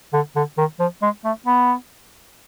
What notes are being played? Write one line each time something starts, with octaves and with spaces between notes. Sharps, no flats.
D3
D3
D#3
F3
G#3
A3
B3